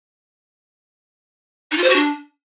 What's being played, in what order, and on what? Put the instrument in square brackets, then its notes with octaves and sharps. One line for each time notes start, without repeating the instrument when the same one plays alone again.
[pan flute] D#4
F4
C5
F#4
D4